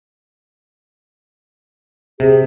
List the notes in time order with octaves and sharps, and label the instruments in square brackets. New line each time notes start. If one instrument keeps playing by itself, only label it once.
[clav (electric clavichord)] C3 [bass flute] G#4